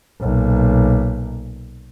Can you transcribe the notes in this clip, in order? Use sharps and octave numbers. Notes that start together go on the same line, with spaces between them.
B1 A#2